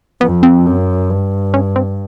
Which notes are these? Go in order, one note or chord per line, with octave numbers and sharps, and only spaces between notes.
F2 B3
C4
F#2
G2
C#4
C4